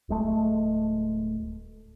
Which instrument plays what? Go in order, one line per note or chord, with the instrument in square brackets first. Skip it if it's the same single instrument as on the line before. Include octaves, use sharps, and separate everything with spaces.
[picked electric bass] D1 G#3 A3